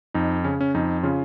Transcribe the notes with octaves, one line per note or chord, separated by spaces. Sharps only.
F2 D#4
C#3 C#4
C#4
F2 D#4
C#3 C#4 F4